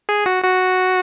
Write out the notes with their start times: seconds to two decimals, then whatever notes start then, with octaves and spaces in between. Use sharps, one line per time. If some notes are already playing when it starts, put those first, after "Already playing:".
0.09 G#4
0.26 F#4
0.44 F#4